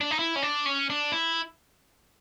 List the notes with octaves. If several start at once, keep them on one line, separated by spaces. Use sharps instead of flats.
D4
D#4
E4
C#4
D4
C#4
D4
E4